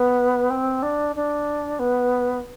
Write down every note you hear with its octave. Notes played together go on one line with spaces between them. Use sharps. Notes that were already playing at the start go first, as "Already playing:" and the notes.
Already playing: B3
C4
D4
D4
B3